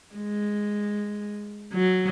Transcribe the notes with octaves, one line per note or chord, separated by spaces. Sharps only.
G#3
F#3